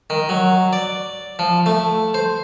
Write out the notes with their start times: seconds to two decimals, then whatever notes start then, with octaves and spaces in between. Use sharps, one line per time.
0.10 D#3
0.29 F#3
0.73 D5
1.39 F3
1.66 A3
2.14 C5